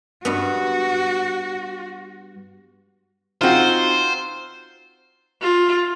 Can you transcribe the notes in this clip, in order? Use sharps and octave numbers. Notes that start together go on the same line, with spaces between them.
G2 B3 F#4
C4 D#4 F4 F#4 C5
F4